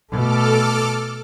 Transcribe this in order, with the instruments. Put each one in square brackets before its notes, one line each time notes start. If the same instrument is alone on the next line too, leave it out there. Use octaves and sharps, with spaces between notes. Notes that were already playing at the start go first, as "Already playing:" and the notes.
[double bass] B2 A3 [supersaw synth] A4 D6 F6